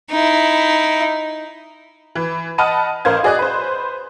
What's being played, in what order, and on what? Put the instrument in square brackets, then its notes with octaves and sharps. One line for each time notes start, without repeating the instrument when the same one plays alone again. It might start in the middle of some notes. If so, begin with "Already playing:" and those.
[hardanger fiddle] D#4 E4
[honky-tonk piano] E3
D#5 F#5 A5 B5 F6 D#7
A1 A#4 C5 F5 G#6
F#4 G#4 D5 D#5 F#6
B4 C5